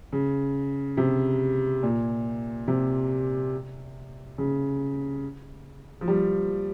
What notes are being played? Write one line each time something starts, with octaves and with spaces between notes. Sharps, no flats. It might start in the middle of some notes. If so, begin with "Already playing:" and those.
C#3
C3
A#2
C3
C#3
F3
G3